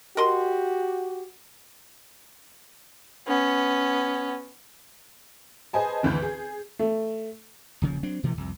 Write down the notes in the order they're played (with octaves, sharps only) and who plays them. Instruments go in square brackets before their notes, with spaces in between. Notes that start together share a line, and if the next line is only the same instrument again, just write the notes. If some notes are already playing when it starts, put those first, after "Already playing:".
[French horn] F#4 [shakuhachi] G4 [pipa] A#4 D#5 C6
[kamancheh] B3 C#4
[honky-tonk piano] G#4 B4 C5 D#5 G#5 A5
G#1 D2 E3 B4 G6
G#4
[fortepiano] A3
[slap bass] D#1 C#3 E3 F3
F#3 C4 D4
B2 E3 F3 A3
C2 F2